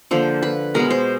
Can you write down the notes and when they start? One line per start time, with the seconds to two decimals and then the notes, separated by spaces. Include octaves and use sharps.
0.11 D3 F3 A#3 C5
0.43 B4
0.74 B2 G#3 B3 A#4
0.91 C5